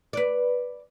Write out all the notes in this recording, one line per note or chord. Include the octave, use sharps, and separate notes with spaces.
B4 D5